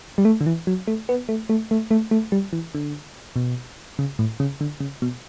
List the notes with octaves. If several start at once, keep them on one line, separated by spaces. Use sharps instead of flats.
G3
A3
D3
E3
F#3
A3
B3
A3
A3
A3
A3
A3
G3
E3
D3
B2
C#3
A2
C#3
D3
C#3
B2